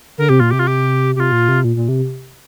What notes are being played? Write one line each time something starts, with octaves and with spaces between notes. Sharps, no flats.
D3 A#4
C3 G4
A#2 F4
C3 G4
F4
G4
C3 F4 G4
A#2
C3
A#2
A#2
C3